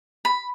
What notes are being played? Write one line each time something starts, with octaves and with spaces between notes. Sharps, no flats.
B5